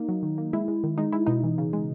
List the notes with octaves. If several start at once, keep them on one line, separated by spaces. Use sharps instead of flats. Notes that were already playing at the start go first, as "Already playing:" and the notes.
Already playing: A#3 D#4
F#3
D#3
A#3
G#3 E4
G#3
D#3
G#3 D#4
G#3 E4
B2 D#4
E3
C#3
G#3